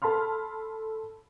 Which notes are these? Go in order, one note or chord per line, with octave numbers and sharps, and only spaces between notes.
A4 A5 B5 C6 F6